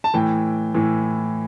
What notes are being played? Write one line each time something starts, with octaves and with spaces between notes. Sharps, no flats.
A5
A2 E3 G5
A2 E3